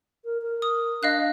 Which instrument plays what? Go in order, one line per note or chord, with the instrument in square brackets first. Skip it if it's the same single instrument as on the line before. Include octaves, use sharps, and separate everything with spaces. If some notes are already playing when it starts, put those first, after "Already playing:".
[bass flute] A#4
A#4
[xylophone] D#6
[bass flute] D4 [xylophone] D#5 F5 F#6